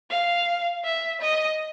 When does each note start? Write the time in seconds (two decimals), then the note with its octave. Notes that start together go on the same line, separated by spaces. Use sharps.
0.10 F5
0.84 E5
1.21 D#5